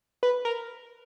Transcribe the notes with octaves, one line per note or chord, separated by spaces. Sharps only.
B4
A#4